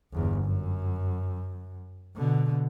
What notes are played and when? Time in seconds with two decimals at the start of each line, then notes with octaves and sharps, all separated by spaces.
0.13 G1 E2
0.46 F#2
2.15 B2 D3